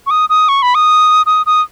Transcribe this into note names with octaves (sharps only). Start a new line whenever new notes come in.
C#6
D#6
D#6
C#6
B5
D#6
D#6
D#6